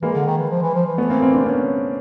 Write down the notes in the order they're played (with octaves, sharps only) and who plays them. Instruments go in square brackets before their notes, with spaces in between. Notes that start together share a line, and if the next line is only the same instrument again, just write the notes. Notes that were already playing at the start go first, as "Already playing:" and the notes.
[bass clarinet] E3 [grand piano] G#3 A#3
[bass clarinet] D3
D#3
E3
F3
E3
F3
E3
[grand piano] A3 B3
A#3 C4
A#3 C4
C4 D4
B3 C#4